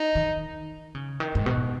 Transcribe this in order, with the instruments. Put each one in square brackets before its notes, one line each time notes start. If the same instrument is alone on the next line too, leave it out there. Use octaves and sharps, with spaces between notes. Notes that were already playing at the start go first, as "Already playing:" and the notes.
Already playing: [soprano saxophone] D#4
[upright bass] D#3
C#3
D#3
G#2
B2